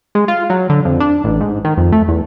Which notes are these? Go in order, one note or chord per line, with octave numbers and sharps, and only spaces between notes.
G#3
F4
F#3
D3
F2
D4
A1
G#2
D#3
F2
A3
E2